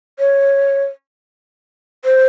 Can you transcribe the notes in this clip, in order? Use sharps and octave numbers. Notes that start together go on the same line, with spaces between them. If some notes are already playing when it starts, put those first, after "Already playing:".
C#5
C5